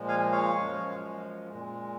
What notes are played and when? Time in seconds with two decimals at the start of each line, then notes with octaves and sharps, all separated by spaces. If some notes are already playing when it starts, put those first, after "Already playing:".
Already playing: A#2 F3 G#3
0.08 F5 G#5
0.32 C#5 F5
0.55 F#2 F3 G#3
1.50 A#2 G#3